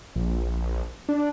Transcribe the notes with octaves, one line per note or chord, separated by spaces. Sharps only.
A#1
D4